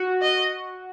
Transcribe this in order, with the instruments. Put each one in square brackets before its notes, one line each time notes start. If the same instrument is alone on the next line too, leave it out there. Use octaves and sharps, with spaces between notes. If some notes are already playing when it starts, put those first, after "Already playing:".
Already playing: [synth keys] F#4
[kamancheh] D#5